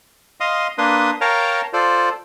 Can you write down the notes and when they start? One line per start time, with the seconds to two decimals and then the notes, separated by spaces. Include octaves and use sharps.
0.40 D#5 F5 C6 D#6
0.78 A#3 D4 B4 C6 D#6
1.21 A#4 C#5 F5 G5 A5 A#5
1.73 F4 A4 C5 D5